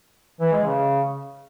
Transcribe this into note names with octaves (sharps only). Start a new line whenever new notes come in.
E3
G#3
C#3